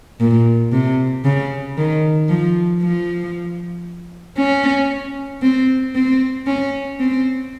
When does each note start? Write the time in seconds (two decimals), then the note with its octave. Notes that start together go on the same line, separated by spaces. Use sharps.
0.20 A#2
0.72 C3
1.25 C#3
1.78 D#3
2.30 F3
2.82 F3
4.38 C#4
5.43 C4
5.95 C4
6.47 C#4
7.00 C4